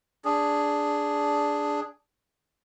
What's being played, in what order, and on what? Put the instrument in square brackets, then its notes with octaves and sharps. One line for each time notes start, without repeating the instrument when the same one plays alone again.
[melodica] D4 G#4